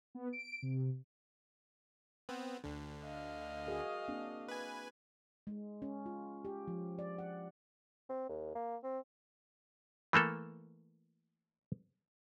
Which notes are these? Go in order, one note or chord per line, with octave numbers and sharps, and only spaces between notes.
B3
D7
C3
B3 C4
D2 D3
D#5 F5
F#4 G#4 A#4
A#3 C4 D4
B4 G#5
G#3
C#4
F4
G4
F3
D5
F#5
C4
D#2
A#3
C4
E3 A3 A#3 A4